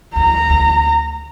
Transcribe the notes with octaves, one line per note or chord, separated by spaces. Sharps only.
D2 A#5
D2